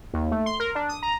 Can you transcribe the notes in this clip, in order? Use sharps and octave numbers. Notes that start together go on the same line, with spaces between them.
D#2
A3
C6
A#4
D4
D#6
A#5